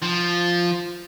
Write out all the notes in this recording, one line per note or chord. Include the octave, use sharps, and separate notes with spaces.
F3